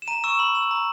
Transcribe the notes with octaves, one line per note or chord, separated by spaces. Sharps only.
E7
A#5 D#7
C#6 E6 E7
B5 F#7
E6
A#5